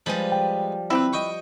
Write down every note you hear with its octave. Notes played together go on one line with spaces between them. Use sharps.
F3 G3 G#3 B4
G5
C4 E4 G4 B4
D#5 G5 C#6